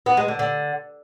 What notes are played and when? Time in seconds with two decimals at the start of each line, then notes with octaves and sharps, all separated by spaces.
0.06 B3
0.17 G#3
0.28 D3
0.39 D3